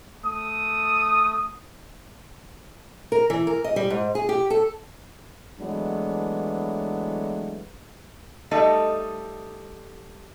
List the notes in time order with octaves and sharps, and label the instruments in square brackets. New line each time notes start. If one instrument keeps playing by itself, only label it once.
[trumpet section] A3 D#6
[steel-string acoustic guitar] A#4
E3
A#4
D#5
G3
G#2
G#4
G4
A4
[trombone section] E3 F#3 G#3 A3 B3 D4
[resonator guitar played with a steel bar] G3 A3 D#4 A4 D#5